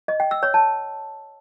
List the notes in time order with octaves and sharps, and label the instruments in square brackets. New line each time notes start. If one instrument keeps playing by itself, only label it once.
[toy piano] D#5
G5
E6
C#5
A5